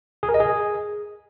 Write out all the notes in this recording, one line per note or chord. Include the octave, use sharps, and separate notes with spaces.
G#4
A#4
D#5
G#4